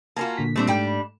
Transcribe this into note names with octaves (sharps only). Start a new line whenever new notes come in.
A#3 F4 F#4 A#4 G#5 A5
A#2 D3 B6
A#2 G3 A3 C4 D4
G#2 G3 A3 D4 G5